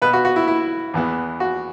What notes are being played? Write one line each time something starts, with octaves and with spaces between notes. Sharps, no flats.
B2 B3 B4
F#4
F#4
E4
E4
E2 E3 B3
F#4